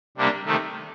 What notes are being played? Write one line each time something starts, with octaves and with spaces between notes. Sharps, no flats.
C3 G3 A#3 D4
C3 D#3 A3